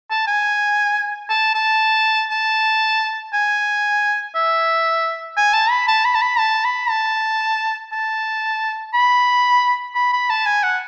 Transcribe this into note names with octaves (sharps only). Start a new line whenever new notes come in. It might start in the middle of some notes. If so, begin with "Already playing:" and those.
A5
G#5
A5
A5
A5
G#5
E5
G#5
A5
B5
A5
B5
A5
B5
A5
B5
A5
A5
B5
B5
B5
A5
G#5
F#5